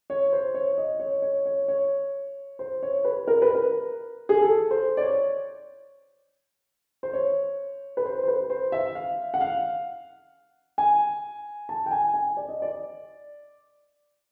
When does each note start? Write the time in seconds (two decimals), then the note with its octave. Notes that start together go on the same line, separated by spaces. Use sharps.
0.10 C#5
0.33 C5
0.54 C#5
0.78 D#5
1.00 C#5
1.22 C#5
1.46 C#5
1.68 C#5
2.59 C5
2.83 C#5
3.05 B4
3.28 A#4
3.42 B4
3.55 A#4
4.29 G#4
4.41 A4
4.71 C5
4.97 D5
5.01 C#5
7.03 C5
7.13 C#5
7.97 B4
8.05 C5
8.23 C5
8.28 B4
8.50 C5
8.72 E5
8.95 F5
9.34 F#5
9.41 F5
10.78 G#5
11.69 A5
11.86 G5
11.91 G#5
12.14 G#5
12.37 D5
12.49 D#5
12.62 D5